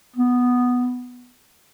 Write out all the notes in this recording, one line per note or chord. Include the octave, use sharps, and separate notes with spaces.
B3